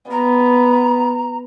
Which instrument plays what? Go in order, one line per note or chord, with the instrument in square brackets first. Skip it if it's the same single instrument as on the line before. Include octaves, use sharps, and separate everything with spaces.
[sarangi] B3 [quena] A#5